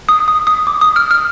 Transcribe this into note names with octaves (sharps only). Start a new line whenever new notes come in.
D#6
D#6
D#6
D6
D#6
F6
F6